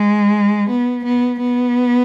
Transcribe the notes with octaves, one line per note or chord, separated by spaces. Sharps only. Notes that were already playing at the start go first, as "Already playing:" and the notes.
Already playing: G#3
B3
B3
B3